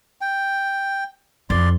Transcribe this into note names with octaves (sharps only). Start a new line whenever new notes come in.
G5
F2 D5 C6